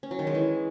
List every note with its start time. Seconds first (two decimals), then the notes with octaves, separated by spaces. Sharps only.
0.03 C#4
0.11 F#3
0.19 D#3
0.27 G#3
0.35 E3